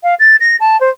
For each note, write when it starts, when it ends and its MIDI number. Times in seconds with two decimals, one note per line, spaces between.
0.03 0.15 77
0.20 0.36 93
0.40 0.56 94
0.60 0.79 81
0.81 0.90 72